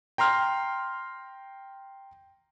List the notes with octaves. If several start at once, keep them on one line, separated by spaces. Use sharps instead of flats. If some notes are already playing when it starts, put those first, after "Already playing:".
G5 A#5 C6 F6